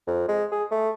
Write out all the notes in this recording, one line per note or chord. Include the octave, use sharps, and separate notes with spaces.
F2
G#3
G#4
A3